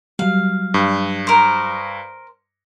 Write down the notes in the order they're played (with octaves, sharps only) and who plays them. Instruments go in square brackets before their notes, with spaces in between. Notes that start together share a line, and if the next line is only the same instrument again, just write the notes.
[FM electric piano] F#3 G3 [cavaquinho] F5
[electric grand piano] G2
[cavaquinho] A#4 C5